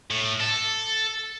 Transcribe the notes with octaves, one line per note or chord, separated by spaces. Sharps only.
A2
A4